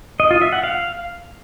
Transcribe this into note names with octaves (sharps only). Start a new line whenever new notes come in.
D#5
F4
E5
F#5
F5